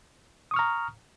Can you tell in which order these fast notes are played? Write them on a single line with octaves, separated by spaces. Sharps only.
D#6 C#6 F6 A#5